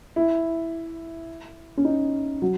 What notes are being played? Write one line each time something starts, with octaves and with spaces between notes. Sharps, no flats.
E4
C#4
D#4
F#3